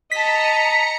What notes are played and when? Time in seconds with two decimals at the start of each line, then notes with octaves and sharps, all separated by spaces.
0.12 D#5 A5 A#5 B6 C#7